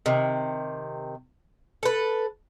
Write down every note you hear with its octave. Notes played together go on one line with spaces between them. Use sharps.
C3 D#3
A4 B4